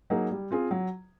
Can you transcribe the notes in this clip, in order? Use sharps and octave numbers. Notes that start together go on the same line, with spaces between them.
F#3 A#3 D#4 G#4
G3
C4 F4 G#4
F#3